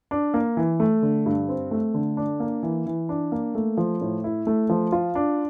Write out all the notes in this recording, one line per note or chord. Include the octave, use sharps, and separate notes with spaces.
D4
A#3
E3
A3
D3
G2
C4
A3
D3
D4
A#3
E3
E3
D4
A#3
A3
F3
A2
E4
A3
F3
F4
D4